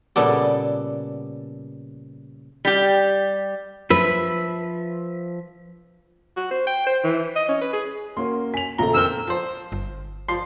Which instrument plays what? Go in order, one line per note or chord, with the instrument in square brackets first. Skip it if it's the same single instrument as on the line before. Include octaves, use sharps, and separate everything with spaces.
[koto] A#2 C#3 G3 B3 A4 D5
[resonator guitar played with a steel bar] G3 G4
[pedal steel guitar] F3 E5 [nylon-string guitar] B4
[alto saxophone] F#4
C5
G5
C5
E3
D#5
C#4
B4
G#4
[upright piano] A#3 C#4 F#4 [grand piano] C6
[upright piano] G#5 [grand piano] B6 F7
[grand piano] A#1 G7 [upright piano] C#3 F4 [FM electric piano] A4 A#5
[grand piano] F2 F6 G7 [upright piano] A#4 C5 G5 [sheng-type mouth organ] E6
[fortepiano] F3 C5
[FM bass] G1
[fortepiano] F3 C6